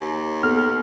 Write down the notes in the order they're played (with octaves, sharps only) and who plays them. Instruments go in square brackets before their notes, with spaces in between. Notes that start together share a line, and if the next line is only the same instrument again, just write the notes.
[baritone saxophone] D#2
[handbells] B3 [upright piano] A4 [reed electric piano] F6